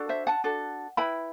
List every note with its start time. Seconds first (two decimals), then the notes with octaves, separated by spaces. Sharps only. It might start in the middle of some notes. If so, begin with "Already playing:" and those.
Already playing: D4 F#4 A4
0.09 C5 E5
0.27 F#5 A5
0.44 D4 F#4 A4
0.97 E4 B4 G5 B5